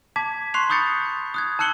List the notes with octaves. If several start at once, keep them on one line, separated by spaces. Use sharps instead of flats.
A5 D6 G#6 B6
C6 C#6 F#6 C7 F7
B5 C#6 D#6 G6 A6 C#7
D#6 F#6 G#6
A5 E6 F#6 C#7 F#7 G7